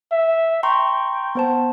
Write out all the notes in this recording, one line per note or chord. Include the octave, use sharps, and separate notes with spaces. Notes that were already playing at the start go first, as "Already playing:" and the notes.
E5
G5 A#5 C6 C#6
B3 C5 A5